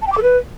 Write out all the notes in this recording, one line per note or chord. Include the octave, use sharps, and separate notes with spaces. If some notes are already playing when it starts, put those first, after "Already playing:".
A5
G5
D6
A4
B4